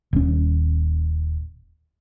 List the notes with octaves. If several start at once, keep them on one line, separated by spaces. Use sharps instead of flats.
D#1 C#4